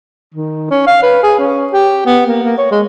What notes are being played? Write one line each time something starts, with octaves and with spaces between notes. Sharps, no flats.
D#3
C#4
F5
B4
G#4
C#4
G4
B3
A#3
A#3
C#5
G#3